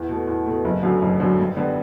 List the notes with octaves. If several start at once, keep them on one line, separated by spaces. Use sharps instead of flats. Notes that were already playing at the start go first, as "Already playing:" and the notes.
Already playing: E2
B2 A3
E2
B2 A3
F#1
F#2 D3 F#3 A3
F#1
F#2 D3 F#3 A3
G2
D3 G3 B3